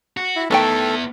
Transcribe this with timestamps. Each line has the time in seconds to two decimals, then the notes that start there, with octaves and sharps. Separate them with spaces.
0.17 F#4
0.36 E4
0.51 D#3 A3 B3 E4 A4 G5